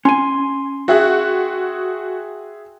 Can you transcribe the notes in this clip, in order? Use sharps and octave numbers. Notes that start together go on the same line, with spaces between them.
C#4 G#5 C6
F#4 G#4 E5 G5 F#6